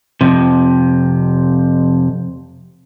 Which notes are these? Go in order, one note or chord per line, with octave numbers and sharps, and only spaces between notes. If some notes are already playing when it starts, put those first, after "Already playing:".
F2 C3